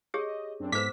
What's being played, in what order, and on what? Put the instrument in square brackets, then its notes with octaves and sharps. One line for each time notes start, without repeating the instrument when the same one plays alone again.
[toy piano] G4 G#4 C#5 [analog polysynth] D#5
[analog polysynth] F#2 C4 D4
[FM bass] G#2 [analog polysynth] B3 A4 E6 [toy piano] C5 D6 [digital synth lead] B6